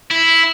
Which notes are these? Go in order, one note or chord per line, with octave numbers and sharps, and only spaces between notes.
E4